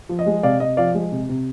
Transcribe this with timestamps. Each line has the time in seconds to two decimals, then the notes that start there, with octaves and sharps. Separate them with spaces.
0.09 F3
0.19 D#5
0.26 G#3
0.43 C3 D5 F5
0.60 C3 D#5
0.77 F3 D5 F5
0.94 G#3
1.12 C3
1.29 C3